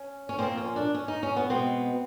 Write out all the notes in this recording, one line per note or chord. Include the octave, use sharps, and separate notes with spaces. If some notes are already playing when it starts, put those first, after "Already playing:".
Already playing: C#4
C#4
A#2 F3 A#3 C4
C#4
D4
C#4
D#4
C#4
B3
B2 G#3 B3 C4